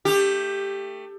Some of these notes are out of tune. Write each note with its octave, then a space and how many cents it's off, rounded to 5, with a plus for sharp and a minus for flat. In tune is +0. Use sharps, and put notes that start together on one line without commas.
A3 +15 G4 +10